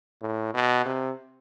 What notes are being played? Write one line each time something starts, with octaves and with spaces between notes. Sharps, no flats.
A2
B2
C3